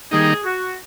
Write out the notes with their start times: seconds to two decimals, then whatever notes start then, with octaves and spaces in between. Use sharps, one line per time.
0.11 D#3 G3 A#3 D#4 G#4
0.44 F#4